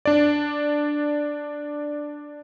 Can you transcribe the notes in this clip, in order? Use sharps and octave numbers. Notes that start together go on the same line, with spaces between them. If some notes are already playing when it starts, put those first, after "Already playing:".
D4 D5